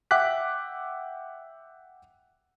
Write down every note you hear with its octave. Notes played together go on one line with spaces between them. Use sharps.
E5 F#5 G5 D6 F#6 B6